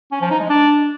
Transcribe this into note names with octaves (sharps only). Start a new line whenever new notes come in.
C#4
F3
D#4
G#3
D4